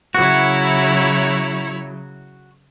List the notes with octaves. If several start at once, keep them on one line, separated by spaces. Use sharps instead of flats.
C#3 F#3 E4 F#4 C#5